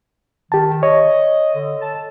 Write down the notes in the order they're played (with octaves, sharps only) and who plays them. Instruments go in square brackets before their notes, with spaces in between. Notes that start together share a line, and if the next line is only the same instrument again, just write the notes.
[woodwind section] D#3 [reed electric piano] G4 A5
[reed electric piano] C#5 [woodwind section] D#5
[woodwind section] D3
A4 A5